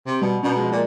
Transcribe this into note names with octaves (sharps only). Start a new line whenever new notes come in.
C3
B2 G3
B2 C#4 D4 A#5
F3 G#3
A#2